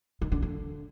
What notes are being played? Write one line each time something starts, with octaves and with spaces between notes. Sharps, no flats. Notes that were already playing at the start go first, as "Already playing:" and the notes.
D#3
D3
D3